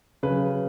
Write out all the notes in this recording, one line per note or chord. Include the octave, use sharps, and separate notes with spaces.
C#3 F#3 B4